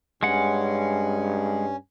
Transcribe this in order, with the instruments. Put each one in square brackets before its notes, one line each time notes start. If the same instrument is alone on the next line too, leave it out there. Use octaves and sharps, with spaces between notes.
[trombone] G2 [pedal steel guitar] G#3 F#5 [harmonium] C#4